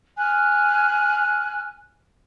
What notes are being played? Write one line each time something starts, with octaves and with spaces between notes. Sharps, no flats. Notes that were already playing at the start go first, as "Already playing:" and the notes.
G#5 F6 F#6